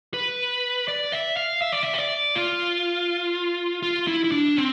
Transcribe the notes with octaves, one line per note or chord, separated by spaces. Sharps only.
B4
D5
E5
F5
E5
D5
E5
C5
D5
F4
F4
E4
E4
D4
C4